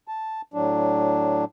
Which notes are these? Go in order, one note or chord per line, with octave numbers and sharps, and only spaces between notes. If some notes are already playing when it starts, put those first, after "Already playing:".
A5
A2 F#3 D4